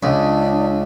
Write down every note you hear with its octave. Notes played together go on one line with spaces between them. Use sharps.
C#2 D4